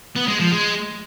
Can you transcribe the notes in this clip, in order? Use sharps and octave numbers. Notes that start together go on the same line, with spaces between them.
B3
G#3
F3
G#3